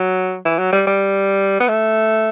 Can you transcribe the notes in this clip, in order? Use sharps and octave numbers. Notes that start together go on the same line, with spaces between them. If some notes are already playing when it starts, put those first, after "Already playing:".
Already playing: F#3
E3
F#3
G3
G3
B3
A3